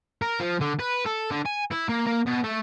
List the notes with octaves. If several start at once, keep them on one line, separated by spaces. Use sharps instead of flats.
A#4
F3
D3
B4
A4
D3
G#5
E4
A#3
A#3
B2
A3